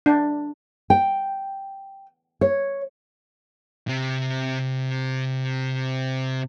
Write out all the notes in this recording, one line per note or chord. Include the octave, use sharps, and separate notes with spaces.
D4
G5
C#5
C3 C4